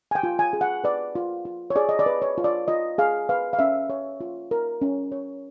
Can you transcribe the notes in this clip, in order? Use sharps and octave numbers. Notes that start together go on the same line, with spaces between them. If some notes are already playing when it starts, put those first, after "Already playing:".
G#5
G5
F4
G#5
G#4
F#5
B4 D5
F4
F4
C#5
G#4 D5
D#5
D5
B4
C#5
F4
D5
F4 D#5
G#4 F5
B4 F5
F5
C#4 E5
C#5
F4
A#4
C#4
C#5